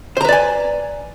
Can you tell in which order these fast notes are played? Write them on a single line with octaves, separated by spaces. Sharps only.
C5 A#5 B4 D5 G#5